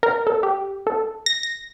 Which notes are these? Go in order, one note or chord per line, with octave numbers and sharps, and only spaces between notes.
A#4
A4
G4
A4
A#6
A#6